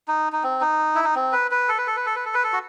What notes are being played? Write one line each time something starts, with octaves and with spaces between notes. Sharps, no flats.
D#4
D#4
C4
D#4
E4
D#4
C4
B4
B4
A4
B4
A4
B4
A4
B4
A4
B4
A4
F#4